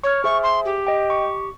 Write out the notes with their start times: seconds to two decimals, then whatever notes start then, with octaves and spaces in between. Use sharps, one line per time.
0.04 C#5 C#6 F6
0.24 G#4 C5 E5 C#6
0.43 C6
0.65 G4
0.87 D#5 G5
1.10 C#6